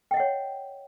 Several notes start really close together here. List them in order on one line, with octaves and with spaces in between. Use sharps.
G5 D#5 F#5 C#5